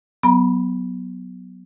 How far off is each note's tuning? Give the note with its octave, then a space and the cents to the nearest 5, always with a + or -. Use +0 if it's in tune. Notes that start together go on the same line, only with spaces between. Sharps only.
F#3 +0 B3 +0 A#5 +40